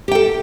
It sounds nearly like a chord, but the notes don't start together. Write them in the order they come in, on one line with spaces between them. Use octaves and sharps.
G4 G5 A4